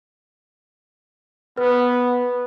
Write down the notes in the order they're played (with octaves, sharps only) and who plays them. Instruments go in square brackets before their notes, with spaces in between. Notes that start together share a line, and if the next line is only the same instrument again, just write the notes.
[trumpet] B3 [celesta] B4